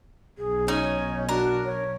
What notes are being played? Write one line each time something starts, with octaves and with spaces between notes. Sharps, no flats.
B1 G#4
C#4 D#4 C#5
D4 F#4 A#4
C#5